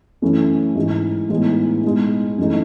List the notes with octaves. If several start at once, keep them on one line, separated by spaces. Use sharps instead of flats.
F#2 E3 A3 C#4 E4
G#2 E3 G#3 D#4
A2 E3 G#3 B3 D#4
B2 G#3 D#4
F#2 E3 A3 D#4